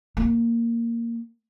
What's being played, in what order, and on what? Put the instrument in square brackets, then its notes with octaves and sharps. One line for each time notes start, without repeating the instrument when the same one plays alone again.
[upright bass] A#3